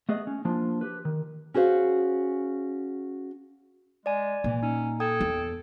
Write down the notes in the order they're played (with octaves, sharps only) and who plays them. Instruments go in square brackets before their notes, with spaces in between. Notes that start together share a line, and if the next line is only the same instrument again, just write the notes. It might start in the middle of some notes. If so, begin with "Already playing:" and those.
[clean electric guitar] A3 B3 G#4 D#5
C#4
F3 A#3 D4 F4
G4 B4
D#3
[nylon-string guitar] C#4 F#4 G#4 C5 F5
[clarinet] G#3 [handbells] D5 G#5
[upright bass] A#2 [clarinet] E3
[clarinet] C#4 [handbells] D#4
[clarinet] A4 [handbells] G5 D#6 G#6
[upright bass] E2